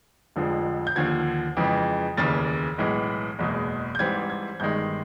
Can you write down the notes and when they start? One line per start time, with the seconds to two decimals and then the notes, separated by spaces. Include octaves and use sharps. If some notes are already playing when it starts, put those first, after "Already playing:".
0.36 F1 F2 D3 F3 G#3
0.87 G6
0.96 D#2 D3 F3 G#6
1.57 F2 C#3 E3 G#3
2.17 F1 D#2 C#3 E3 A6
2.78 B1 A2 E3 G#3
3.39 F#1 E2 B2 G#3
3.95 G6
3.99 G#2 E3 G3 C4 G#6
4.30 G#6
4.60 G1 G2 D#3 G#3 G6